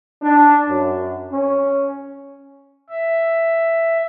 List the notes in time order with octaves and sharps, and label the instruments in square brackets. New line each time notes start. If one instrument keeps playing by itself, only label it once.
[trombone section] D4
F#2
C#4
[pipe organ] E5